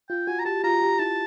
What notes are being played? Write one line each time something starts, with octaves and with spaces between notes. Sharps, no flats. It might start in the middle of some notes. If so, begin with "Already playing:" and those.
F4 G5
F#4 G#5
A#5
G4 A5
F4 A#5
G4
E4 A5